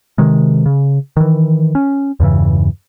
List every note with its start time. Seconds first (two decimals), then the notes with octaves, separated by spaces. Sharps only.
0.18 C3 D#3 G#3
0.66 C#3
1.17 D#3 E3
1.75 C#4
2.20 E2 G2 C#3 E3